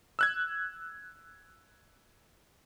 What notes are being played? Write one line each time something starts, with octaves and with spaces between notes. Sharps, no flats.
E6 F#6 G#6